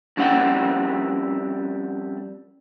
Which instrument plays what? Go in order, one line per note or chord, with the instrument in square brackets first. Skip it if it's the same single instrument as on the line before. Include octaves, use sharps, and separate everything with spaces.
[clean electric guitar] F2 G3 C#4 E4 F#5 G5